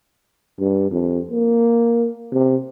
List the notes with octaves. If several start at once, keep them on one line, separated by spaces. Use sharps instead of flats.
G2
F2
A#3
C3